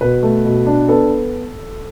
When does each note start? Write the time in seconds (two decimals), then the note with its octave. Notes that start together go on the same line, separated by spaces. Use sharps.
0.01 B2 B4
0.23 A3
0.45 B2
0.67 D4
0.88 B3 A4